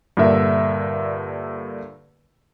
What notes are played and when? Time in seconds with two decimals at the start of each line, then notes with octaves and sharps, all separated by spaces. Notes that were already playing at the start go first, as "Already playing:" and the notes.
0.17 G2 A#2 D3 A#4 E5